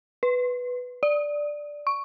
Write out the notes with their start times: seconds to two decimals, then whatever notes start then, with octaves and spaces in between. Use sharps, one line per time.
0.23 B4
1.03 D5
1.87 C#6